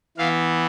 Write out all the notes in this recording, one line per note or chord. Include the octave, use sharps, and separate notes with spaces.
E3 B3 F5